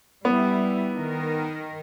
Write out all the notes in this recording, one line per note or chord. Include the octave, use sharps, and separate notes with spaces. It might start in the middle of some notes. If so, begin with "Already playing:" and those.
G3 B3 E4
D#3 A#4